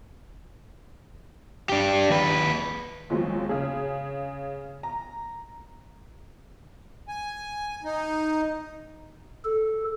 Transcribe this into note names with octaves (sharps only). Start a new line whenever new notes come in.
D4 G4
D#2 B4
D#2 F3 F#3 G#3 C4
C#3 G#4
A#5
G#5
D#4
A4